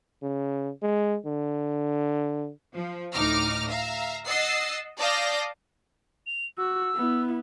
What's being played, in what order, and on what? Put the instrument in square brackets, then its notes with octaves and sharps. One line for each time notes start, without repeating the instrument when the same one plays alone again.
[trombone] C#3
G#3
D3
[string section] F3
D2 A2 D#4 D6 F6 A#6
E5 F5 A#5
D#5 F#5 E6 A6 C7
D5 F5 A5 D#6 G6 A#6
[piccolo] F7
[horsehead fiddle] F#4 [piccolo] E6
[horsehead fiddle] B3 E4